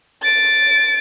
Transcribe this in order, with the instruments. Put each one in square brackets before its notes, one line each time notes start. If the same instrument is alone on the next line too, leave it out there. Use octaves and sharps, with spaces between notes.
[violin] A6 D7